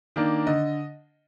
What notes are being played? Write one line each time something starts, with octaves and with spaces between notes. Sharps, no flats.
D#3 A#3 D4
D3 D#5